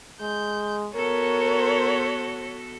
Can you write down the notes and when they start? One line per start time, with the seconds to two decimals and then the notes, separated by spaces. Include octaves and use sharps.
0.21 G#3 G6
0.95 B3 F#4 A4 A#4 C#5